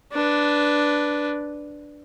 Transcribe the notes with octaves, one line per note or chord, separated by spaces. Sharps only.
D4 B4